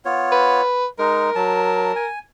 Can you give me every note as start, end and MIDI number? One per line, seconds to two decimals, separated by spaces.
0.05 0.62 59
0.05 0.62 65
0.05 0.62 73
0.32 0.86 71
0.99 1.30 56
0.99 1.30 63
0.99 2.07 70
1.35 1.92 54
1.35 1.92 81
1.96 2.19 80